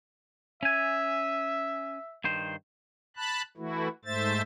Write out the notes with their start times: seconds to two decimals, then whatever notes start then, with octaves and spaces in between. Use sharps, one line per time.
0.63 C#4 E5 G#5
2.24 G2 D#3 C5
3.17 A5 B5 F#6
3.57 E3 A3 E4 F#4
4.05 G#2 A3 C5 E5 A6